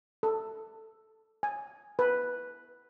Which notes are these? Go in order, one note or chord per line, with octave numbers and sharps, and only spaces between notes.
A4
G#5
B4